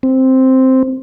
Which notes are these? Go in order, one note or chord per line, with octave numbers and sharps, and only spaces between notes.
C4